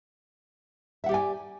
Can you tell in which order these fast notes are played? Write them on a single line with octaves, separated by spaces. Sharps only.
E5 F#5 G4 D5 G#5